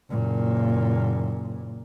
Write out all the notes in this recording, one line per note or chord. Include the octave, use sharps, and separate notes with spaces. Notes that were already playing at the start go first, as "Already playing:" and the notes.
F#1 A#2